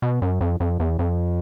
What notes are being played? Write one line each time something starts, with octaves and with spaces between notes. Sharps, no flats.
B2
F#2
F2
F2
E2
F2